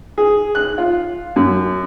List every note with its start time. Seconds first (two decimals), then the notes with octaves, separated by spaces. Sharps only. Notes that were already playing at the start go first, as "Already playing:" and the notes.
0.18 G#4
0.55 F#6
0.78 F4
1.36 F#2